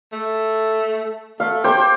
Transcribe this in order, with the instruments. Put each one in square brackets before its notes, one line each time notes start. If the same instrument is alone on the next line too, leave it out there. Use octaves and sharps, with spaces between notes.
[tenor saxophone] A3
[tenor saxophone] A3 [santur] F5
[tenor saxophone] G4 [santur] C5 D6